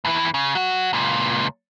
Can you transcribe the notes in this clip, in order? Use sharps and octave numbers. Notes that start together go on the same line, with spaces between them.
E2 E3
C#3
F#3 F#4
C#2 A#2